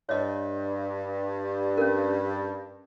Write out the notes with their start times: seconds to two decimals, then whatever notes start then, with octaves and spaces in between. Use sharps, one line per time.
0.09 G2 C#5 D#5
1.77 C#4 A#4